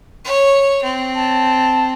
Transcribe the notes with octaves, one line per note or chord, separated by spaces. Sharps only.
C#5
C4
A5